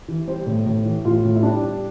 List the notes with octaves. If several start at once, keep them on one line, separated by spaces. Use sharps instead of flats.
E3
G3 C5
A2
A2
E3
A2 F4
A2
E4
G3 D4
G3